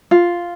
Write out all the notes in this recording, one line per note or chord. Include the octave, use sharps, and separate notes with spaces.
F4